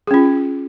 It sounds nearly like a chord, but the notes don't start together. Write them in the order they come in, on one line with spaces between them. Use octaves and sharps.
G#4 C#4 F4